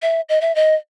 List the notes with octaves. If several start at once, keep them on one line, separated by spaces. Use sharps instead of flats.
E5
D#5
E5
D#5